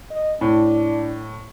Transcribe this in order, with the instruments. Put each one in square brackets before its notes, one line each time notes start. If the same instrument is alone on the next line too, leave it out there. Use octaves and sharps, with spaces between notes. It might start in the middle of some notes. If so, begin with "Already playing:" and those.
[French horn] D#5
[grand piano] A2 [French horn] D4